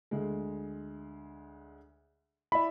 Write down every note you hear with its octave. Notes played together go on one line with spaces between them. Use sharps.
D2 G#3
E4 D5 E5 B5